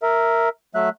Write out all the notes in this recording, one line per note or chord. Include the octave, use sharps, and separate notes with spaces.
A#4 E5
F#3 A3 E5 F#6